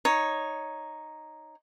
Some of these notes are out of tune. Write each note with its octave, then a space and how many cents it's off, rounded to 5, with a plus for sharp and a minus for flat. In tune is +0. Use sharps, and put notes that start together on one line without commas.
D#4 +0 C#5 +0